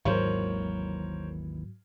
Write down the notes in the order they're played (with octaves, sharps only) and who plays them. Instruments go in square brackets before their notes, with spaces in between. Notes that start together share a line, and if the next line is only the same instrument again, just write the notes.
[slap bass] G#1 D#2 E3 [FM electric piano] G#2 F#3 [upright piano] A#4 C5 C#5